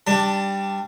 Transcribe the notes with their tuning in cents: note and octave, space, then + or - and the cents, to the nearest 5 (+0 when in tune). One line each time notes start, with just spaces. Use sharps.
G3 +0 D4 +0 A5 +25